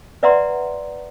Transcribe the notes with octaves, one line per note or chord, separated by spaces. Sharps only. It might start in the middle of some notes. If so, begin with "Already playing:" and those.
B4 D5 E5 F#5 A#5 C6